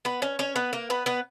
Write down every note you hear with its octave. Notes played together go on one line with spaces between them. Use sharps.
B3 B4
C#4 C#5
C#4 C#5
B3 B4
A#3 A#4
B3 B4
B3 B4